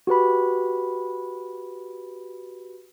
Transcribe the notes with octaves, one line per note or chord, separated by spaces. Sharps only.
F#4 G4 B4 B5